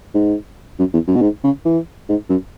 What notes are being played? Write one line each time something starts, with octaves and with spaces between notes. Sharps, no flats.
G#2
F#2
E2
F#2
B2
G#2
C#3
E3
G#2
F#2